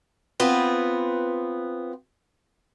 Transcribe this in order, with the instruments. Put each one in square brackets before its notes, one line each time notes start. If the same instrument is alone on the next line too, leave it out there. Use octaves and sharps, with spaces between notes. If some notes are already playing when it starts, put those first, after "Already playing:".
[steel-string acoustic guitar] B3 C4 F4 B4